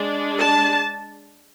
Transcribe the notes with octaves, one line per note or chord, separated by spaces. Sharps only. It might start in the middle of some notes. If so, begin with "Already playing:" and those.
Already playing: G#3 D4
A5